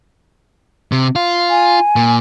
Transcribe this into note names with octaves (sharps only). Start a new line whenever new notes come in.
C3
F4
G#5
A#2